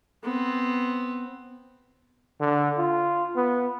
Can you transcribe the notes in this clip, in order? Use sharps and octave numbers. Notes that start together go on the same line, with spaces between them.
B3 C4
D3
F4
B3